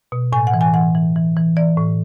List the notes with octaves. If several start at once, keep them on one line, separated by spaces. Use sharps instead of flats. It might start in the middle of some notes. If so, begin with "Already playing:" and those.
B2
A2 G#5
F#5
E3
G#5
E3 F#5
E3
E3
E3
E3 D5
A2